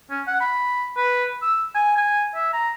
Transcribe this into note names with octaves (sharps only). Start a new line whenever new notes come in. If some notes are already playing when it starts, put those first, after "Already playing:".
C#4
F#5
B5
B4
E6
G#5
G#5
E5
A#5